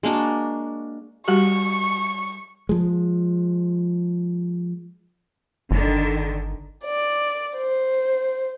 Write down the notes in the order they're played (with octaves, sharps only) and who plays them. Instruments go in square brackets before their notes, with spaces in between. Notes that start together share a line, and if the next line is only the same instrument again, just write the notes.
[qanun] G#3 A#3 D4 F#4
[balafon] G3 F#4 G4 [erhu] C#6
[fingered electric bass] F3 G#3
[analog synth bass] G1 [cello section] D3 D#3
[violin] D5
C5